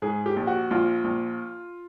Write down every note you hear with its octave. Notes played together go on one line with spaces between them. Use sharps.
G#2 G#4
G4
A#1
F#4
A#1 F4
A#1